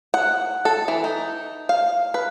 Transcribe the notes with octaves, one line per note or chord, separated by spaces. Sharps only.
F#5
A4
E3
D#4
F5
B4